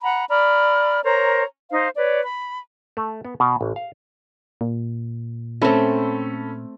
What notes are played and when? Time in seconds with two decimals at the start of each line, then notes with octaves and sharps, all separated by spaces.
0.03 F#5 A#5 B5
0.29 D5 A#5 B5 F6
1.03 A#4 C5 C#5 A#5
1.71 D#4 C5 F5
1.96 B4 C#5 D5
2.24 B5
2.97 A3
3.25 B3
3.40 B2
3.61 A1
3.76 F5
4.61 A#2
5.62 A3 C4 C#4 A4 B5